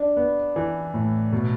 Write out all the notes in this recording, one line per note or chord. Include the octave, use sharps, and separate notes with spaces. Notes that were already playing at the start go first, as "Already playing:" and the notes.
Already playing: D4
B3
E3
A2
B2